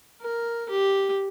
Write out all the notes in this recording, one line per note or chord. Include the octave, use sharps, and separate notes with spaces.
A#4
G4